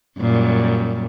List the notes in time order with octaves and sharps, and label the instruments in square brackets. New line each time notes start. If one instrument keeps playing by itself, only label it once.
[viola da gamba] F#2 A#2 G3